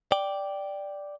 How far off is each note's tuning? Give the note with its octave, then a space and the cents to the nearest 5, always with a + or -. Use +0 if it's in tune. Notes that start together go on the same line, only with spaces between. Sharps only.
D5 +0 G5 +0